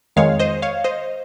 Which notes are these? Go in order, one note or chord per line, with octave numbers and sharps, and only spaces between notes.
F2 D#3 G#3 C#5 F5
C5 D#5
C#5 F5
C5 D#5